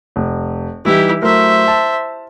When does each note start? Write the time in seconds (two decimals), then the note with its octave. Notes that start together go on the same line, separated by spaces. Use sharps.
0.16 F1
0.85 E3 G3 D#4 E4 G4
1.22 F#3 A3 A#4 C5 E5
1.68 A5